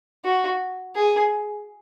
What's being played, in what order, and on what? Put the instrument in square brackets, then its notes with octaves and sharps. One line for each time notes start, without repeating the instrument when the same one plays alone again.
[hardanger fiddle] F#4
G#4